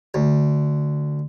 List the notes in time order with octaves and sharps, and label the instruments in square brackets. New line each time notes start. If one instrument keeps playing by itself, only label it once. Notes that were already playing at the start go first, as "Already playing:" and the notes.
[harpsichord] D2